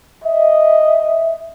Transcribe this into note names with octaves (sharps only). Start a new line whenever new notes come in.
D#5 E5